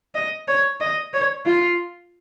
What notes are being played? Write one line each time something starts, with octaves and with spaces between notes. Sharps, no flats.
D#5
C#5
D#5
C#5
F4